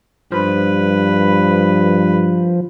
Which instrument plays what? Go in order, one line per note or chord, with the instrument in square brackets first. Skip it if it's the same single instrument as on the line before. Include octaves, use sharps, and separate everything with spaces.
[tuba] G2 [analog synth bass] F3 [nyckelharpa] B4